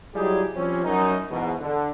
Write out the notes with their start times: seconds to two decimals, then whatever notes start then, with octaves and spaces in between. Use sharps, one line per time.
0.15 F#3 G3 D#4 E4 G4 G#4
0.56 F3 G3 C4 C#4
0.85 F#2 D#4
1.29 E2 G#2 B2
1.60 D3